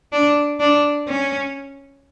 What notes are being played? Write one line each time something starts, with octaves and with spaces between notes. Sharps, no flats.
D4
D4
C#4